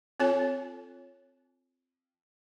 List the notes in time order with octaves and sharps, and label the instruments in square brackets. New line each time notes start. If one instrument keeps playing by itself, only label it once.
[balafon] C4 F4 A4 C#5 G#5